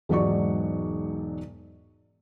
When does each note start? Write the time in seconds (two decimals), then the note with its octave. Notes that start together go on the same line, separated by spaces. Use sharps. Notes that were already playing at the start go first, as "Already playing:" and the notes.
0.09 E1 G#2 F#3 D#4 D5 C#6